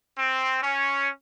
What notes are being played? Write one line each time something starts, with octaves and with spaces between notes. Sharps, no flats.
C4
C#4